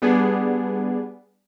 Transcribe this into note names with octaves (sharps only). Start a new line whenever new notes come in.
G3 B3 D4 G#4